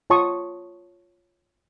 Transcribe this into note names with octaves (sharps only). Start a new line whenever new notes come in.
F4 C#5 A5 C6 C#6 D#6